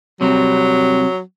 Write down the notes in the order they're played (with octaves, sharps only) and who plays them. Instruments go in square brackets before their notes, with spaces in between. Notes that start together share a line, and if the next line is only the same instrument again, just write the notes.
[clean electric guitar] C3 G3 C4 [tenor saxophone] F#3